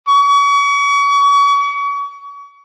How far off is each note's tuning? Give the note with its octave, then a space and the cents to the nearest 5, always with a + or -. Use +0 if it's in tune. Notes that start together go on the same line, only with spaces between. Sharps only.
C#6 +35